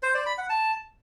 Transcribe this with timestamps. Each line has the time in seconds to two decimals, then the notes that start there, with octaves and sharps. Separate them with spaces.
0.03 C5
0.14 D5
0.26 B5
0.38 F#5
0.50 A5